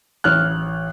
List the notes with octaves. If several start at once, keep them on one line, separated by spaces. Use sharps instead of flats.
A1 F6 F#6